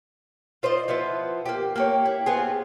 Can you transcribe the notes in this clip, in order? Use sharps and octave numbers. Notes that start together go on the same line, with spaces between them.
F4 C5 D5 D#5
F3 B3 E4 F4
A#3 G4
A#3 G4 C#5
E4
B3 C4 F4 G#4